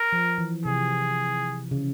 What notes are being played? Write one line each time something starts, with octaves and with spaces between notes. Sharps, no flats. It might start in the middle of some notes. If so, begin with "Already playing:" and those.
Already playing: A#4
F3
E3
C3 G#4
C#3